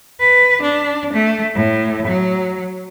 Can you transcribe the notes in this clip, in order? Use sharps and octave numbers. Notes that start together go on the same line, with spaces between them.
B4
D4
A3
A2
F#3